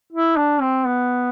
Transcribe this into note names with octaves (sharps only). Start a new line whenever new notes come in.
E4
D4
C4
B3